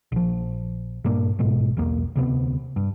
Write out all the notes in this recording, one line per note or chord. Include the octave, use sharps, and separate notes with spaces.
A#1 F3
G2 A#2 A#3 D4
A1 G#2 B2 G#3
B1 E2 A#3
D2 C3 G3 B3
G2